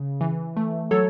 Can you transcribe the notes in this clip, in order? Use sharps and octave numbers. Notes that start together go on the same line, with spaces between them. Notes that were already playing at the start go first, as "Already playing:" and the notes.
Already playing: C#3
E3
A3
F#3 A4 C#5